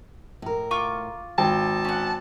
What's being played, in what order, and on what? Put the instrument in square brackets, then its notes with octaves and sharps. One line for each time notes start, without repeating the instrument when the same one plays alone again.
[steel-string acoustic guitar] A2 A#4
[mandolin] F4 C#6 D6
[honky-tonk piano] G#1 [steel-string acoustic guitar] G5 [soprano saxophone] A5
[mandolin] C#4 F#5